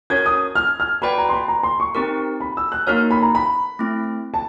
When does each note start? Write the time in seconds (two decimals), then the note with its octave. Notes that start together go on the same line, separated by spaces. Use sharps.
0.10 C#4 F#4 A#4 C#5 G#6
0.26 D#6
0.55 F6
0.80 F6
1.02 F#4 B4 D5 G5 B5
1.18 A#5
1.29 C6
1.33 B5
1.48 A#5
1.63 C6
1.80 C#6
1.95 C4 D#4 G4 A#4 C#6
2.40 B5
2.57 E6
2.72 F#6
2.87 A#3 D#4 F#4 A#4 C#5 F6
3.11 B5
3.23 A#5
3.35 B5
3.79 A3 C4 E4
4.34 A5